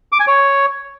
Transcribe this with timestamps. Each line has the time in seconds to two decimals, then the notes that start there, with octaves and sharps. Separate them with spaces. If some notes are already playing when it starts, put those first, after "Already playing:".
0.12 D6
0.20 G#5
0.27 C#5